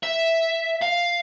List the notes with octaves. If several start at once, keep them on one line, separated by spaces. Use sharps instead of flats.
E5
F5